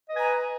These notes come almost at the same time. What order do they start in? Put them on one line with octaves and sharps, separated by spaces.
D#5 B4 G#5 A#5